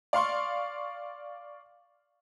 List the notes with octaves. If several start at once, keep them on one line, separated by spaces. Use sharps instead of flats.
D5 F5 C6 C#6